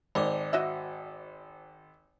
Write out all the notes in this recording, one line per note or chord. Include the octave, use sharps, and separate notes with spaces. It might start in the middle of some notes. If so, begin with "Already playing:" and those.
G#1 C5 D5 D6
F#4 D#5 E5